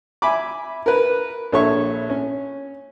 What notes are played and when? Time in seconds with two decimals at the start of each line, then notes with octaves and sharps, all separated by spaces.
0.22 E5 G#5 B5 D6
0.86 A#4 B4
1.52 A#1 A4 C#5 E5 C#6
2.10 C#4